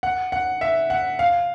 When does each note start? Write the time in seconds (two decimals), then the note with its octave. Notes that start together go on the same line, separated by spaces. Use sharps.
0.03 F#5
0.32 F#5
0.61 E5
0.90 F#5
1.19 F5